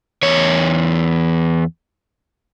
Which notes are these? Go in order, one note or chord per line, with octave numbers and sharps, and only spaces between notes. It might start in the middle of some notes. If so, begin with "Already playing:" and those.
E2 C#5